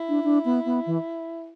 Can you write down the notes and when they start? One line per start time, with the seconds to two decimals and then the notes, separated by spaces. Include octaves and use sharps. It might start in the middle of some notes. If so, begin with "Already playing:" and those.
Already playing: E4
0.09 D4
0.24 D4
0.45 B3
0.65 B3
0.86 E3